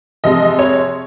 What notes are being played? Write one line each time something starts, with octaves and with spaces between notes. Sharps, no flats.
C3 F3 G#3 D#5
C#5